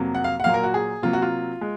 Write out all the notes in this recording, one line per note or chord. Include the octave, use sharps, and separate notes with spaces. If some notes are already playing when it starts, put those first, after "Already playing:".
Already playing: F2 C3 F#3 A#3
F#5
F5
F#5
A#2 F#3 A#3 F5
A#4
F#4
G#4
C3 F#3 A#3 F4
F#4
F4
G#3